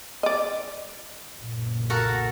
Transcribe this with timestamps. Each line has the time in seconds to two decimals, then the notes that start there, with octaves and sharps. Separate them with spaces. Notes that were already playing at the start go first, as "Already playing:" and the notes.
0.23 D5 D#5
1.37 F#1 B1 A#2
1.90 F#4 A4 A#4